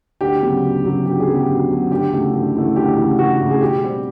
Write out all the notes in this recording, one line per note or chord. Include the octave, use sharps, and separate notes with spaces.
D2 G4
C#3 F#3 B3
D2
C#3 F#3 B3
D2 G4
G#4
C#3 F#3 B3
G4
D2
C#3 F#3 B3
D2 G4
C#3 E3 A3
D2
C#3 E3 A3
D2 G4
C#3 E3 A3
D2 F#4
C#3 E3 A3
G#4
B2 G4
G3 C4